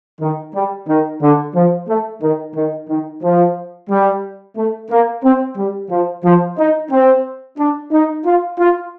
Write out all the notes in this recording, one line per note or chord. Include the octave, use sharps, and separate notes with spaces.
D#3
G3
D#3
D3
F3
A3
D#3
D#3
D#3
F3
G3
A3
A#3
C4
G3
F3
F3
D#4
C4
D4
D#4
F4
F4